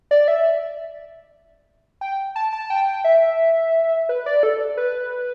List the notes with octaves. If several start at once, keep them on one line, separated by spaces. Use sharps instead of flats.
D5
E5
G5
A5
A5
G5
E5
B4
D5
A4
B4